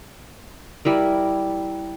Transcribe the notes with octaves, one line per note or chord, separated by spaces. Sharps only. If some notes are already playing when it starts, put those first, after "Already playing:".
G3 E4 A#4